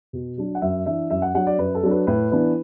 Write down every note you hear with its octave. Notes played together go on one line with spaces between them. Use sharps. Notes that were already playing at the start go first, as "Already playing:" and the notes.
B2
F#3 D4
F#5
F#2 E5
E3 D4 E5
F#2 E5
F#5
F#3 D4 F#5
D5
F#2 B4
A4
F#3 D4
B4
A2 B4
E3 B3 D4